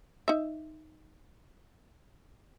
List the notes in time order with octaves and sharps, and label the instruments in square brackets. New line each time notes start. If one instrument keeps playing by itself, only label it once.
[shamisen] D#4 E5